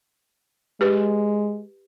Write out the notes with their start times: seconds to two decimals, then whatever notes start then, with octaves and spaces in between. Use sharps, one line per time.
0.81 G#3 G4 B4